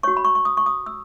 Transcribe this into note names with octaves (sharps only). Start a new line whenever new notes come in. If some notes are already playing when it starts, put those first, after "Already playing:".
F#4 C#5 C#6
B5
C#6
C#6
D#6
C#6
D#6
E6